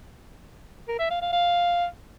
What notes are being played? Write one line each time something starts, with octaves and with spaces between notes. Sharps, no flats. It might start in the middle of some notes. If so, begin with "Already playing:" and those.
A#4
E5
F5
F5
F5